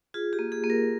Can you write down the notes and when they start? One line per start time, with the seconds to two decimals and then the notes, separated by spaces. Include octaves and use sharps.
0.14 F4 G#4
0.33 G4
0.39 A#3
0.52 G#4
0.64 A#3
0.70 A#4